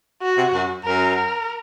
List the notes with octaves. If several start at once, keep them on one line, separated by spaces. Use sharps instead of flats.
F#4
C3
F#2
F#2 A#4
A#4